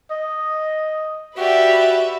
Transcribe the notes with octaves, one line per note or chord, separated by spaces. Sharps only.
D#5
F#4 G4 B4 D5 E5